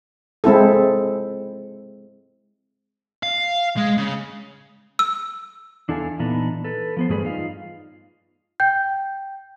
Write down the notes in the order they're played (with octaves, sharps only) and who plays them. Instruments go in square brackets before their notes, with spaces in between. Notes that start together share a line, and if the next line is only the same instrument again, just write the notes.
[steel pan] G#3 C4 E4 A4
[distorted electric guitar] F5
G#3
C#3
[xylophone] E6
[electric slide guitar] E2 D4 E4 A4 F5 G#5
A#2 E3 B3 D4 D#4
A4 B4
F3 B3 C5
G2 E3 A3 G#4 B4 D5
D#4 F4 F5
[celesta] G5 G6